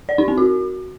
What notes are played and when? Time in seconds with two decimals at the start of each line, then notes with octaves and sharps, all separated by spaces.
0.09 D5
0.18 D#4
0.28 C4
0.38 F#4